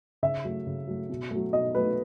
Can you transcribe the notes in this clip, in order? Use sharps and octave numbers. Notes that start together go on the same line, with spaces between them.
C#3 E5
F#3 A3
C#3
F#3 A3
B2
F#3 A3
B2 D#5
F#3 A3 B4